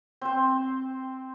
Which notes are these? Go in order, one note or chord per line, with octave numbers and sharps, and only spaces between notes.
C4 C5